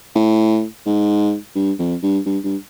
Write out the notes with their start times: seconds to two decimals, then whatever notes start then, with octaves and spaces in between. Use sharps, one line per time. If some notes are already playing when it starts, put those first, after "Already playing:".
0.15 A2
0.86 G#2
1.55 G2
1.79 F2
2.03 G2
2.26 G2
2.44 G2